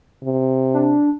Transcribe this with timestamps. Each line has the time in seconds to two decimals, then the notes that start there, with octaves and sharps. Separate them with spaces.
0.23 C3
0.74 D4